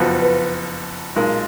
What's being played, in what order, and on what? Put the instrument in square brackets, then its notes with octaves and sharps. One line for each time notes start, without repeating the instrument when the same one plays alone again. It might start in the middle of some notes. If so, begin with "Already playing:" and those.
Already playing: [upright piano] F#1 F2 F3 B3 F#4
[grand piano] B4
[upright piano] B1 A#2 G#3 [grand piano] A#4